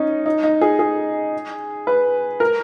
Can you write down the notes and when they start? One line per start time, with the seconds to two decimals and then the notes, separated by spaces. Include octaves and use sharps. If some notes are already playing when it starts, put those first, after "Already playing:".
Already playing: C#4 D#4
0.26 D#4
0.43 D#4
0.61 G#4
0.79 G#4
1.87 B4
2.40 A#4